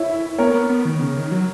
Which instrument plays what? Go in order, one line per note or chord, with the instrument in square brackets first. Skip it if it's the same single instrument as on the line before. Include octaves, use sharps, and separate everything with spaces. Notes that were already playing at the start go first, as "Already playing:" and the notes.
Already playing: [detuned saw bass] E4 [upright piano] C#5 E5
[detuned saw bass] B3 [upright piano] A#4 C#5
[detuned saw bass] B3
B3
D#3
C#3
D#3
F#3